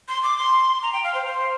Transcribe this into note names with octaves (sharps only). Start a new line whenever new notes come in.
C6
D6
C6
A#5
G5
F5
C5
C5